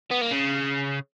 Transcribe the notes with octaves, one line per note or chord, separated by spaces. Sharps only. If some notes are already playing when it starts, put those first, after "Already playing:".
B3
A#3
C#3